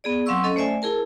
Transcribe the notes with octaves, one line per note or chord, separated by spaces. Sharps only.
B3 G#4 D5
F#3 C4 F5 C6 C#6 E6
C#4 A4 D#5
A3 C5 D5 E5 G#5
E4 G#4 A#4 A5